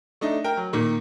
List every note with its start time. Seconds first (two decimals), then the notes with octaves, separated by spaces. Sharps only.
0.21 A3 D4 D#4
0.44 A#4 G5
0.57 F#3
0.73 A#2 D#3 A#3